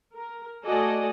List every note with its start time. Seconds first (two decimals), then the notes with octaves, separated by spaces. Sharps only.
0.16 A#4
0.66 A3 F#4 A4 D5 D#5 G#5